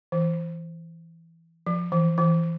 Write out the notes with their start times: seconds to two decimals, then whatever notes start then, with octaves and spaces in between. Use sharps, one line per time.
0.12 E3
1.67 F3
1.92 E3
2.18 E3